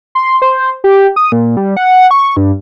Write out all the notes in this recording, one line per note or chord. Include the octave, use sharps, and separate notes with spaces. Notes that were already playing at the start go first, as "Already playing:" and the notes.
C6
C5
G4
D#6
A#2
G3
F#5
C#6
G2